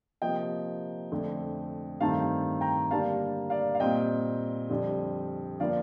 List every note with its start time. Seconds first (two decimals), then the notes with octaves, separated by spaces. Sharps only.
0.22 C3 F3 A#3 D#5 G5
1.12 F2 D3 A3
2.01 G2 D#3 A3 C4 F5 A5
2.61 G5 A#5
2.91 D3 G3 A#3 F5 A5
3.50 D5 F5
3.75 F5
3.80 A#2 G3 C4 D#5 G5
4.70 F2 D3 G3
5.60 D3 F3 A#3 D5 F5